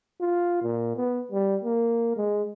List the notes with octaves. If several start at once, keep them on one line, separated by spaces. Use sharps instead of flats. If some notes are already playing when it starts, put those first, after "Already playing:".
F4
A#2
B3
G3
A#3
G#3